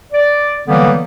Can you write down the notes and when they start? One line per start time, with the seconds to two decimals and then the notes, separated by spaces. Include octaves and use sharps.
0.13 D5
0.67 D3 E3 F#3 G3 A#3 B3